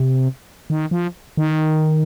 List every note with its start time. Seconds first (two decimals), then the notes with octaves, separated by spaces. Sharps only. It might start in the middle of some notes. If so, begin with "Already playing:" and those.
Already playing: C3
0.70 D#3
0.91 F3
1.37 D#3